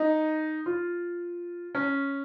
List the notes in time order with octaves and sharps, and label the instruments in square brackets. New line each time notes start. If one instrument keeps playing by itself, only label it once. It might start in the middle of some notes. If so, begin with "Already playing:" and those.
Already playing: [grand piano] D#4
F4
C#4